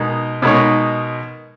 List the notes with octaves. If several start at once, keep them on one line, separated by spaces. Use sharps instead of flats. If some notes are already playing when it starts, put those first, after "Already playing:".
Already playing: B2 G#3 D#4 A#4
B2 G#3 D#4 A#4 C#5